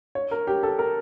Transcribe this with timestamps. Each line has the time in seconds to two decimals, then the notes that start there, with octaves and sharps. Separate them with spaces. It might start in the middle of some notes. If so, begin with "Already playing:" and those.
0.15 C#5
0.31 A#4
0.47 G4
0.63 A4
0.79 A#4